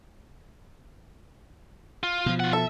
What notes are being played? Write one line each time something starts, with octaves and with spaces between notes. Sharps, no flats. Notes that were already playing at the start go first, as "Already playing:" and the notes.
F4
B2 F3
F4 F#5
A4 E5